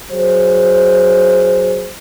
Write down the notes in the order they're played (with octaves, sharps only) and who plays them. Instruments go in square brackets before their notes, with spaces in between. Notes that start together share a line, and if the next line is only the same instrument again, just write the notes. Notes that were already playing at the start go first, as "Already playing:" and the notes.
[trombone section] F#3 G#4 C5